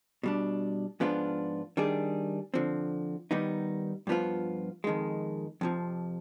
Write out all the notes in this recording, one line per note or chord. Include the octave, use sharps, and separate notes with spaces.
B2 G3 D4
G#2 F3 B3 D4 F4
D#3 G3 D4 G#4
D3 F3 C4
D#3 G3 B3 D#4
G2 F3 B3 F4
F2 D#3 G#3
F2 C3 F3